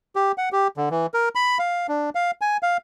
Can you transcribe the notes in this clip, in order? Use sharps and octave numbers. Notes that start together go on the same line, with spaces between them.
G4
F#5
G4
D3
E3
A#4
B5
F5
D4
F5
G#5
F5